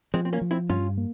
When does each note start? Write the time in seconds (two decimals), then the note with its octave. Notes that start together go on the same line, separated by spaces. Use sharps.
0.14 F3 G#3 C4
0.25 C4
0.33 A#3 C#4
0.41 F3
0.51 C4 E4
0.70 G2 C#4 F4
0.98 A#3